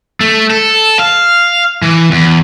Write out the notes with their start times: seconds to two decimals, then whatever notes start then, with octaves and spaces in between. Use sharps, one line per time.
0.21 A3
0.50 A4
0.99 F5
1.82 E3
2.11 E2